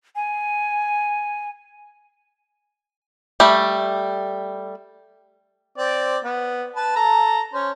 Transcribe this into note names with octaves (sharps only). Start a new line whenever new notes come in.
G#5
G3 A3
C4 D5
B3
B4 A5
A4 A#5
C#4 C5